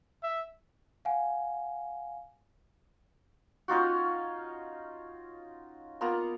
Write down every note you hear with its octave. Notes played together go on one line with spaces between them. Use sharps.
E5
F5 F#5 G#5
C#4 D#4 F4 F#4
A#3 B3 F4 A#5